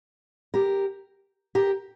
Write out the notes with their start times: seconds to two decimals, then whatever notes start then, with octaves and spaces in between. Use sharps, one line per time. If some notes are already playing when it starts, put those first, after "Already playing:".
0.54 G4 A#4
1.55 G4 A#4